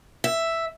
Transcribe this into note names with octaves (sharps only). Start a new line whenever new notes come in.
E5